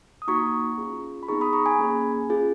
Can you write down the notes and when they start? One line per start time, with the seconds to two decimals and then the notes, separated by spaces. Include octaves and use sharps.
0.22 D#6
0.28 A#3 D#4 F#4 A#5 C#6
0.78 C#4 F4 G#4
1.23 B5
1.28 B3 D#4 G#4 A#5 C#6
1.41 B5 D#6
1.53 A#5 C#6
1.66 G#5 B5
1.78 A#3 C#4 G#4
2.30 C#4 F4 G#4